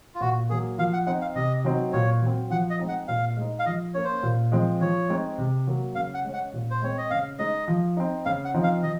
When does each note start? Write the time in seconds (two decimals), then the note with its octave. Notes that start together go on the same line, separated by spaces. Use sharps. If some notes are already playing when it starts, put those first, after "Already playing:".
0.15 F4
0.21 A#2 F#4
0.49 F#3 A#3 G#4
0.78 F3 F5
0.93 F#5
1.06 C4 D#4 F#5
1.21 F5
1.35 C3 D#5
1.65 F#3 C4 D#4
1.93 A#2 C#5
2.22 F#3 C4
2.50 F3 F#5
2.70 D#5
2.79 G#3 C4 D#4
2.89 F#5
3.08 A#2 F5
3.37 G#3 D#4
3.59 F5
3.66 F3 D#5
3.94 A#3 C#4 C#5
4.05 C5
4.23 A#2
4.52 F3 G#3 C4
4.81 F3 C#5
5.09 G#3 C4 D#4
5.38 C3
5.67 F#3 A#3
5.95 C#3 F5
6.14 F#5
6.25 G#3 C#4
6.34 F#5
6.53 A#2
6.70 C5
6.82 G#3 C4 C#5
6.98 D#5
7.10 C#3 F5
7.39 G#3 D#4 D#5
7.68 F3
7.97 C4 D#4
8.26 C#3 F5
8.45 F#5
8.54 F3 C4 D#4
8.63 F5
8.83 F3 D#5